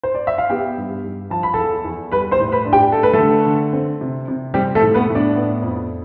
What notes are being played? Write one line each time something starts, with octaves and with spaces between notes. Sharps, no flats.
C5
D5
E5
F5
B3 G4 G5
G2
G2
F3 A5
B5
E2 A4 A5
E2
G3 B4 B5
C5 C6
A2
B4 B5
D4
G4 G5
A3 A4
B4
A3 A4
D3
D3
C4
C3
C3
G3 C4 G4
A3 A4
A2
B3 B4
A2
D4 D5
B3
F2